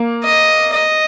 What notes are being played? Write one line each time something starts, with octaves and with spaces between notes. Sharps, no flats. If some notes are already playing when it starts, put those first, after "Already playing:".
Already playing: A#3
D#5
D#5